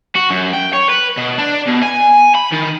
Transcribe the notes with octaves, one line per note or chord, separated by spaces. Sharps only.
F#4
F#2
G5
C#5
B4
B2
D4
B2
G#5
B5
D#3